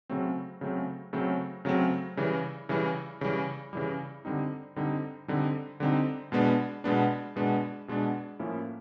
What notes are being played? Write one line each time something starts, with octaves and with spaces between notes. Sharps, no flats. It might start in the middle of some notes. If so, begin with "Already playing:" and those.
C#3 F#3 A3 C4
C#3 F#3 A3 C4
C#3 F#3 A3 C4
C#3 F#3 A3 C4
C#3 E3 G3
C#3 E3 G3
C#3 E3 G3
C#3 E3 G3
D3 G3 C4 D#4
D3 G3 C4 D#4
D3 G3 C4 D#4
D3 G3 C4 D#4
B2 G#3 B3 D4
B2 G#3 B3 D4
B2 G#3 B3 D4
B2 G#3 B3 D4
A2 F3 A#3 C#4 E4